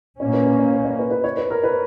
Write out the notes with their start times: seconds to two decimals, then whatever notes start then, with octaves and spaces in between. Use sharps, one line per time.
0.20 A#2 A#3 C#4 C#5
0.34 B4
0.46 B4
0.59 C#5
0.73 B4
0.85 C#5
0.99 B4
1.11 B4
1.24 C#5
1.37 B4
1.50 A#4
1.64 B4